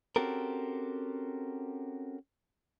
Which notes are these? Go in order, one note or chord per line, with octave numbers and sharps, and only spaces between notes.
C4 C#4 F#4 G4 A4 A#4